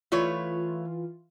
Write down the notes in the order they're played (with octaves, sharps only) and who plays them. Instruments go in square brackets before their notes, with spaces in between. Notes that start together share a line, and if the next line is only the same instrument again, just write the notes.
[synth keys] E3 F4 [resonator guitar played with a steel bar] A3 B4 C#5